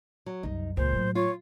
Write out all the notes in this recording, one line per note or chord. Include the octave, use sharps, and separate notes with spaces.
F#3
C2 F#2 D#4
C#2 A#2 C5
A2 F#3
F4 C#5